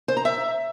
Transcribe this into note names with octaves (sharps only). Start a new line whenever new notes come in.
C5
A#5
E5